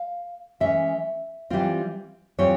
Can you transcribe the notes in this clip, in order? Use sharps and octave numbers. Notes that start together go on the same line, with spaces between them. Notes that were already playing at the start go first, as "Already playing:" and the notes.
Already playing: F5
E3 G#3 C#4 E5
E3 G3 C4 F4
E3 G3 C4 F4 C#5